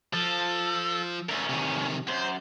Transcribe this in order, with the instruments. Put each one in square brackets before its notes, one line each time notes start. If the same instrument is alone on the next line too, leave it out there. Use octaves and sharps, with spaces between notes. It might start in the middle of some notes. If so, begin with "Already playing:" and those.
[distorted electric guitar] F3 [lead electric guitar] A4
[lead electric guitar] D2 C#4 [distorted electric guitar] A#4 E5
[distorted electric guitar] C3 D#3
[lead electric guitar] F#2 [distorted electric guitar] C5